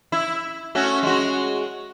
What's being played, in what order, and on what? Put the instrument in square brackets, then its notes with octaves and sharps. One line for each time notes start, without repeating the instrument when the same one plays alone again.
[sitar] E4
A3 C#4 F#4
G#3 F#4